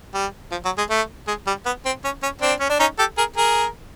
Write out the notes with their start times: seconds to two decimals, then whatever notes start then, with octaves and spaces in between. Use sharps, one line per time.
0.14 G3
0.51 F3
0.65 F#3
0.78 G#3
0.90 A3
1.27 G#3
1.47 G3
1.66 B3
1.85 C4
2.04 C#4
2.23 C#4
2.41 C4 D4
2.60 C#4
2.70 D4
2.80 C#4 D#4
2.99 G4 A4
3.18 G#4 A#4
3.36 G#4 A#4